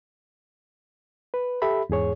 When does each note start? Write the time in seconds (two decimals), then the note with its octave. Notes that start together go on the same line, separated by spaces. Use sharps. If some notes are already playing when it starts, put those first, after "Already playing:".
1.34 B4
1.62 G4 A4 E5 B5
1.89 E2 G#2 G#4 C#5